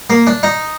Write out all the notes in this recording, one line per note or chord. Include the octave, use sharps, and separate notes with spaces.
A#3
D4
D#4